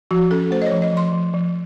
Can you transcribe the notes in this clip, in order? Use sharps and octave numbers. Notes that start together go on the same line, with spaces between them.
F3 F#4
C#4 A4
A3 C5
D#5
C#5
F3
D#5
F3 C6
F3
F3